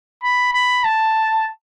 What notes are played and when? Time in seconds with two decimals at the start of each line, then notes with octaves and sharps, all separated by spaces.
0.23 B5
0.53 B5
0.84 A5